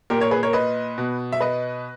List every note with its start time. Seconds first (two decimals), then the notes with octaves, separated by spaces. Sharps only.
0.10 A#2 G4 A#4
0.20 A#4 C#5
0.31 G#4 B4
0.43 A#4 C#5
0.53 B4 D#5
0.98 B2
1.32 E5
1.40 B4 D#5